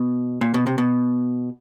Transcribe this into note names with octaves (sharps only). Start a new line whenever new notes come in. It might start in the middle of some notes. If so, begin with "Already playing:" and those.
Already playing: B2
A#2
B2
C3
B2